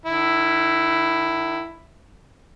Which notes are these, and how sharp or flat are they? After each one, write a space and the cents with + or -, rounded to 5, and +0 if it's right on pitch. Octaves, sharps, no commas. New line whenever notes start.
D#3 -40 E4 +5